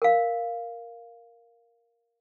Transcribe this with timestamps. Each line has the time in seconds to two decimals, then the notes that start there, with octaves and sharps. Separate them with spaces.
0.02 A#4 F5